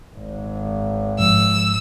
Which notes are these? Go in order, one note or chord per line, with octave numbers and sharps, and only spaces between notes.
G#1
G#2 F3 E6